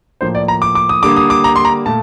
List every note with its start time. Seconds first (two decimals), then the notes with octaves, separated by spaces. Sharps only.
0.21 A2 F3 A#3 C5
0.35 D5
0.48 A#5
0.62 D6
0.75 D6
0.89 D#6
1.03 D3 G3 A#3 D6
1.16 D#6
1.30 D6
1.44 A#5
1.56 C6
1.65 A#5
1.86 A#2 A3 A5